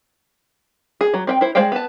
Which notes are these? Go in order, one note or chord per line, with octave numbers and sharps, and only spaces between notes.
G#4
F#3
C4 D#5 G5
E4 C5
G#3 C5 D5 F5 G5
B3 A5